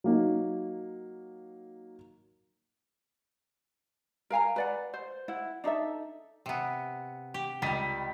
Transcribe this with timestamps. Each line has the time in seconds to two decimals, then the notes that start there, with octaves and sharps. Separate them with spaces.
0.04 F#3 A#3 D#4
4.30 A#4 F5 G#5 A#5
4.56 B4 D5 F#5
4.94 C5
5.28 E4 F#5
5.64 D4 D#4 A4 E5
6.46 C3 B3
7.34 G4
7.62 C#2 G3 A#4 B6 D#7